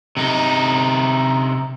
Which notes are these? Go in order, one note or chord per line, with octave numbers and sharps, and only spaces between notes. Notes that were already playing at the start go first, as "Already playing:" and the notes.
C3 D#4